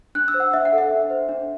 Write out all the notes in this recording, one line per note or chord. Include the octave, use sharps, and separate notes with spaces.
D4 F#6
E6
C5
F#5
D4 E5
F#5
A4
E5
D4
C5
D4